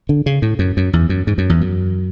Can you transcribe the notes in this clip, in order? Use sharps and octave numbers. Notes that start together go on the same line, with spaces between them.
D3
C#3
A2
F#2
F#2
E2
F#2
G#2
F#2
E2
F#2